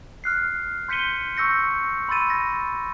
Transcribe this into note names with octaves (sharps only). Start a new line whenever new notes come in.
F6 F#6 C7
C6 G6 B6 C#7 D#7 G7
C#6 E6 G6 A#6 C#7
B5 C6 E6 A6 D#7
A6 A#6